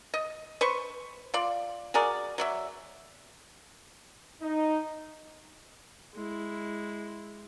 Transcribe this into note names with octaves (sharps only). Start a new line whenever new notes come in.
D#5
B4 C5 C#6
F4 D5
F#4 G#4 A#4 D5
F#3 D5 E5
D#4
G#3 E4